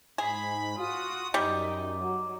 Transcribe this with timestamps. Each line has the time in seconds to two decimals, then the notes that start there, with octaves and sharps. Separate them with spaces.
0.18 G#2 G#4 B5
0.77 F4 F#4 D#6
1.34 F#2 G3 D#4 D5
2.01 F#3